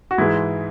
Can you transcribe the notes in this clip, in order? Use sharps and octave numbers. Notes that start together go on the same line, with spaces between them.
F#4
G#2 E3 G#3 E4